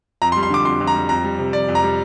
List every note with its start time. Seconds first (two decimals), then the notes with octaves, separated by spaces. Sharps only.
0.22 F2 A#5
0.32 C6
0.36 G3
0.43 C6
0.50 D3 D6
0.65 F2 C6
0.80 F2
0.87 A#5
0.95 G3
1.09 F2 A#5
1.24 G3
1.39 C3
1.53 F2 D5
1.68 F2
1.75 A#5
1.83 G3